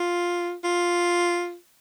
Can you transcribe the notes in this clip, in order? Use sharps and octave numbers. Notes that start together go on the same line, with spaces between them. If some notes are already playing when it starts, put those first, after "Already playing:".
Already playing: F4
F4